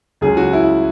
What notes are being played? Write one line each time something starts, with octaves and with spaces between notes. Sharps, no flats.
C#2 C#3 F#3 C#4 G#4
F#4
E4